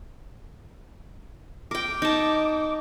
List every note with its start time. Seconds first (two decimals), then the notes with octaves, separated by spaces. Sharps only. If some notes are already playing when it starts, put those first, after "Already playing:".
1.71 A#4 G5 D6
2.02 D#4 A5